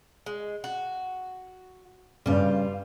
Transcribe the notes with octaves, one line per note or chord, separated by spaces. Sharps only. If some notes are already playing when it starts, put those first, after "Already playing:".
G#3
F#4
G2 C#3 G3 F4